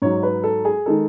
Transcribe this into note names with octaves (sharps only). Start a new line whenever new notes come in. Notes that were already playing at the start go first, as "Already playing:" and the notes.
G#2 F#3 C#5
B4
A4
G#4
D#3 G#3 A4